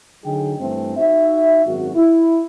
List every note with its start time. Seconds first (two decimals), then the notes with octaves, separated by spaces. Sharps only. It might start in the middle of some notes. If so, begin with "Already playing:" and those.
0.23 D3 F#3 D#4 G#4 G5
0.58 G2 E3 A3 C4
0.97 D#4 F#4 E5
1.65 G#1 F#2 F#4
1.94 E4